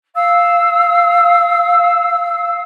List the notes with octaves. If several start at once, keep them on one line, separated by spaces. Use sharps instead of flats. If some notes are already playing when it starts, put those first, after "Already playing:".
F5 E6